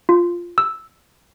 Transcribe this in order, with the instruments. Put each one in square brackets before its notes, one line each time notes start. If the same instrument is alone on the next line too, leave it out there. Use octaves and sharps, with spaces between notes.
[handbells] F4
E6